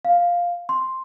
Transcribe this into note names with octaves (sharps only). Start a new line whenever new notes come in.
F5
C6